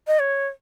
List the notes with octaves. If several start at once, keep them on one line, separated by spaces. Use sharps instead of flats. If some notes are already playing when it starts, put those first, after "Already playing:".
D#5
C#5